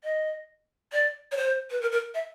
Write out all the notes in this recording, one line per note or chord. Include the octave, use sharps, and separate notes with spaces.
D#5
D5
C#5
C5
B4
A#4
A#4
E5